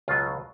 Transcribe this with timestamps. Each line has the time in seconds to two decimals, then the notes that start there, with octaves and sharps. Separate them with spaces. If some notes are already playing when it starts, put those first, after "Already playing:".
0.08 C#2 B2 F#3 F4